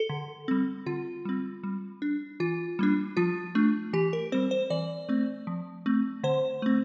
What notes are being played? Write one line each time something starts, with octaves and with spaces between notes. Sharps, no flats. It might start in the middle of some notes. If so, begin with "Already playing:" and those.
Already playing: A4
D3
G3 C4
D3 F4
G3 C4
G3
D4
E3 F4
G3 A#3 D4
F3 F4
A3 D4
E3 G4
A#4
G3 C4 C5
C5
E3 D5
A3 C4
F3
A3 C4
D3 C5
A3 C4